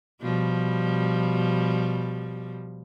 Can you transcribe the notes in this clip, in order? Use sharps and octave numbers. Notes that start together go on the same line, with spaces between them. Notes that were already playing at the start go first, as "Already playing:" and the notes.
B2 F3 G3